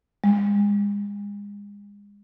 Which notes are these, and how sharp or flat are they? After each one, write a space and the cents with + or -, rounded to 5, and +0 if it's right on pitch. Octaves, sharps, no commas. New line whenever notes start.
G#3 -35